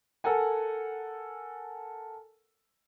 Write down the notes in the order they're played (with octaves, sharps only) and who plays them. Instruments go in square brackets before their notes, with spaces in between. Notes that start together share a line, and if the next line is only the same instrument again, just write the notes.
[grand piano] A4 A#4 F#5 G#5